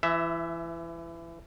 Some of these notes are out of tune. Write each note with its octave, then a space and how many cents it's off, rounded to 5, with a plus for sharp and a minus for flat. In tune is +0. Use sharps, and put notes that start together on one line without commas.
E3 +25 E5 +0